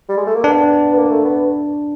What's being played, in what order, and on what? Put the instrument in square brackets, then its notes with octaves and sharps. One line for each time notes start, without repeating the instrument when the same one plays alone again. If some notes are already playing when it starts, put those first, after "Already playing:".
[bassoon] G3
G#3
A3
A#3
[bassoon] B3 [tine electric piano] D4
[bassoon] B3
A#3
A3
B3